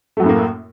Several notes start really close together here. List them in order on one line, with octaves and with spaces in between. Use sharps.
A3 F#3 F#2 A2 A#3